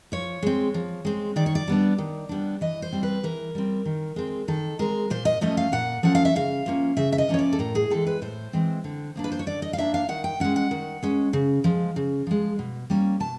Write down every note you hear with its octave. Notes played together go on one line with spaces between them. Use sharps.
F3 C#5
G#3 C4
F3
G#3 C4
D#3 D5
C#5
D5
G3 B3 D4
D#3
G3 B3 D4
E3 D#5
C5
G3 C4
B4
E3 A#4
G3 C4
D#3
G#3 C4
D#3 A4
G#3 C4 A#4
A#2 C5
D#5
F3 A3 C#4 D#5
F5
A#2 F#5
F3 A3 C#4 F#5
F5
E5
C#3 F5
F3 A#3 C#4
C#3 E5
E5
D#5
F3 A#3 C#4 C#5
D5
A4
A2 A#4
G#4
E3 G#3 C4 A4
B4
A2 C5
E3 G#3 C4
D3
F3 A#3 D4
B4
C5
C#5
D3 D5
D#5
F5
F3 A#3 D4 E5
F5
D#3 F#5
G5
G#3 C#4 F#5
F#5
D#3
G#3 C#4
C#3
F3 G#3
C#3
F3 G#3
B2
G3 A#3 C#4
B2 A5